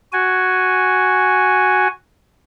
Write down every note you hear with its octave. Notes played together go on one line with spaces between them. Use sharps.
F#4 G#5